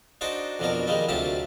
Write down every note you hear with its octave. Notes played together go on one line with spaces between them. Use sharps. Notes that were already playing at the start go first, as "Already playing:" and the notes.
D4 D#4 F#4 C5 D5
F2 B2 F3 F#3 D4 A#4
D#3 G3 G#3 A#3 D#4
D2 C3 F#3 F4 G4 A5